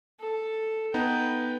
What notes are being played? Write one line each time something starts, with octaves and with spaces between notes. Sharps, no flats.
A4
B3 D#4 B4 G5